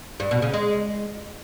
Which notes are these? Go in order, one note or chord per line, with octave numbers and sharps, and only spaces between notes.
G2
B2
C#3
G#3